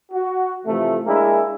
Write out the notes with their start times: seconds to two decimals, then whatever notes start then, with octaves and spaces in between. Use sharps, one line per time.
0.11 F#4
0.65 C3 E3 F3 A3
1.05 G#3 A#3 D4 E4 G#4